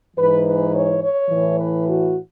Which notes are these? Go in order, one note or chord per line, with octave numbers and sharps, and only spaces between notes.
G#2 E3 B4
B4
C#5
C#5
A2 E3
B4
F#4